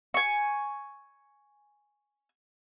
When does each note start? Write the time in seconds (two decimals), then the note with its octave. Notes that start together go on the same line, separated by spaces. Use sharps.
0.14 G#5 C#6